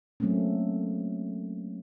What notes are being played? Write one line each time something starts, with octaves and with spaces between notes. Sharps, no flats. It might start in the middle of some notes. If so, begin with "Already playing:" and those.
F#3 A3 A#3 C4 C#4